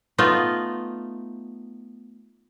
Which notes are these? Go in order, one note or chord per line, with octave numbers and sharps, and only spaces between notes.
A3 B3 D#4 F4